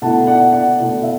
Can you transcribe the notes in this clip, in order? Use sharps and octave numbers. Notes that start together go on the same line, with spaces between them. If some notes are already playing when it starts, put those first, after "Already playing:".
B2 A3 E4 F#5 A5
D5 F#5
D5 F#5
B2 A3 E4 D5
E5